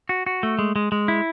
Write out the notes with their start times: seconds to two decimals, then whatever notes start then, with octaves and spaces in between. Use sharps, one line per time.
0.09 F#4
0.26 F#4
0.43 A3
0.59 G#3
0.76 G#3
0.92 G#3
1.08 E4